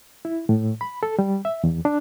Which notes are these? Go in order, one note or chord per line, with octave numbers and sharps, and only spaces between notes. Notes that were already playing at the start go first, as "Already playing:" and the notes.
E4
A2
B5
A4
G3
E5
E2
D4